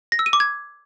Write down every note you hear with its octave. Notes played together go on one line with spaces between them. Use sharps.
A#6
E6
D#7
D6
G#6